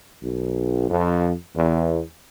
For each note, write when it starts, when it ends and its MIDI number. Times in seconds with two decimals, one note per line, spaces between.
0.22 0.87 35
0.89 1.31 41
1.55 2.01 40